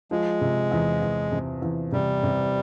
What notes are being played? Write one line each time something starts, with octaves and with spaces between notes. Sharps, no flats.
F3 G#3
C3
E2
E2
C3
E2
C3 G3
C3